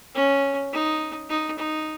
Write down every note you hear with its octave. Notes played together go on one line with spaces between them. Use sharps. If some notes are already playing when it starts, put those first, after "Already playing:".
C#4
D#4
D#4
D#4